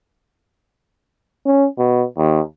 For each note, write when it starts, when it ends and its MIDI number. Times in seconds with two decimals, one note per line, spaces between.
1.45 1.66 61
1.78 2.03 47
2.17 2.40 39